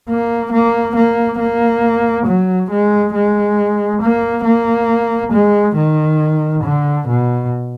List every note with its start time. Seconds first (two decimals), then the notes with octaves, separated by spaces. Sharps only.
0.09 A#3
0.52 A#3
0.96 A#3
1.40 A#3
2.26 F#3
2.71 G#3
3.14 G#3
4.02 A#3
4.45 A#3
5.32 G#3
5.77 D#3
6.64 D3
7.08 B2